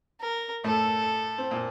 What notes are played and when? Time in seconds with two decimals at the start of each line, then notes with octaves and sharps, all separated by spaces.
0.20 A#4
0.64 A2 A3 A4
1.38 C4
1.51 A#2 A#3